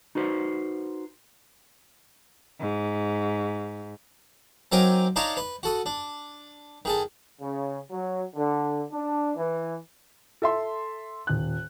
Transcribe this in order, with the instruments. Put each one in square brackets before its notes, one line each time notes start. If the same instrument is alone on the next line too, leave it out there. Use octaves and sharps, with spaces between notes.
[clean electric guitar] D#4 F#4 B4 C5
[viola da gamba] G#2
[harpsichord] F#3 C4 D#4 A#4 G#5 D6
D4 D#4 A#4 C#5 F5 A5
B4
F#4 A4 D#6
D4
D#3 G#4 A4
[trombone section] C#3
F#3
D3
D4
E3
[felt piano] A4 E5 C6
D#1 F#6